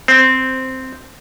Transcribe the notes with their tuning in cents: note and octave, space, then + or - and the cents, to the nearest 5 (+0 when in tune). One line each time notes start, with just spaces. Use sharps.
C4 -5 C5 +0